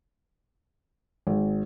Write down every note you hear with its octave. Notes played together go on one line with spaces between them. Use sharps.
G#1